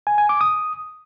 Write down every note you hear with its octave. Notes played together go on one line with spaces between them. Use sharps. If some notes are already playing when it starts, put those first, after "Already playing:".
G#5
G#5
D6
D#6